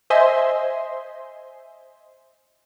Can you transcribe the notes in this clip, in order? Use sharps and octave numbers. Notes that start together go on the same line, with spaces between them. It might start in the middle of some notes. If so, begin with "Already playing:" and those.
C5 D#5 E5 G#5 C6